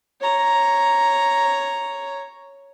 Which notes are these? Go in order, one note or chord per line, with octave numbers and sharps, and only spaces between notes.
C#5 A#5